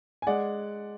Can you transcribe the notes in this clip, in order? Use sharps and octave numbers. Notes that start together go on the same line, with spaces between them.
G#5
G#3 D5 F#5